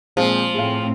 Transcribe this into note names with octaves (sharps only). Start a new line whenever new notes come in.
A#2 F3 G#3 C4
A2 C4 G#4 F5